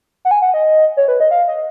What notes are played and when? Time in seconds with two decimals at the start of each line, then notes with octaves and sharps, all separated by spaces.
0.25 F#5
0.31 G#5
0.42 F#5
0.54 D#5
0.97 C#5
1.08 B4
1.20 D#5
1.31 F5
1.48 D#5